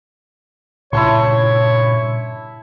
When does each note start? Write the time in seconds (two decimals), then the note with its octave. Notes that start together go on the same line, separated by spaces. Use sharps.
0.93 G2 A#2 C#3 E4 C#5 A5 C6